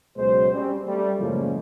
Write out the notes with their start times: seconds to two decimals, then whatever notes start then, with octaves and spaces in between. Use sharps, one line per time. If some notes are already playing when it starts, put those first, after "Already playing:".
0.17 C#2 B2 F#3 G#3 C5
0.53 G3 C4 C#4
0.86 G3 A3
1.19 F#2 A2 C#3 F3 G#3 A#3